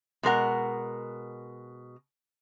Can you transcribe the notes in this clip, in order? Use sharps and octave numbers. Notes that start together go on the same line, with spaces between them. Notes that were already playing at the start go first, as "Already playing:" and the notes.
B2 G#3 A#4 F#5